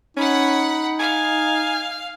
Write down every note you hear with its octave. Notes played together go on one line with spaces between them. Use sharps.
C#4 D#4 F#5 B5
F5 G#5